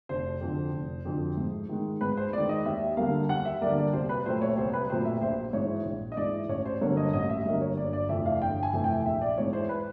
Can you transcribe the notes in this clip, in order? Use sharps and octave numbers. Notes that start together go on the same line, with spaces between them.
F1 C5
F2 D3 F3
F1
F2 D3 F3
G#2
D#3 G#3
G#2 B4
C5
D#3 G#3 D5
D#5
D#2 E5
D3 G3 A#3 F5
D#2 F#5
E5
D3 G3 A#3 D5
D5
C2 C5
B4
A#2 F#3 A3 C4 C5
C#5
C2 C5
B4
A#2 F#3 A3 C4 C5
E5
A#1 C5
G#2 E3 C#5
A#1
D#5
G#2 E3 D5
A1 C#5
C5
G2 D3 F#3 A#3 C#5
D#5
A1 D#5
E5
G2 D3 F#3 A#3 D#5
C#5
G1 D5
D5
F2 C3 E3 A3 E5
F5
G1 G5
G#5
F2 C3 E3 A3
G5
A#1 E5
D5
G#2 E3 C#5
C5
B4